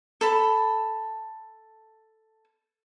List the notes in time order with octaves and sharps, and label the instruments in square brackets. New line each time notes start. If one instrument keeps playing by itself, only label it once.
[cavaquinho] A4 A5 B5